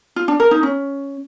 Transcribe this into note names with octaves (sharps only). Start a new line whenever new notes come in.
F4
D4
A#4
D#4
C#4